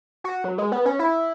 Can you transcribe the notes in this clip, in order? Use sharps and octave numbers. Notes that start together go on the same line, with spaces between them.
F#4
F#3
G#3
B3
C#4
E4